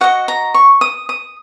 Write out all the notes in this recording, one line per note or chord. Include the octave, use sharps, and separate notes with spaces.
F#4 D#5 F#5
A#5
C#6
D#6
D#6